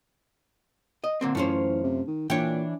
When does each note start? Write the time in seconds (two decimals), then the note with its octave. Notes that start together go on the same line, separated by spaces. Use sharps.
1.04 D#5
1.21 D3 A#3 C4
1.35 F#2 E3 A3 C#4 F4 C5
1.84 C3
2.07 D#3
2.30 A#2 E3 D4 C#5 G5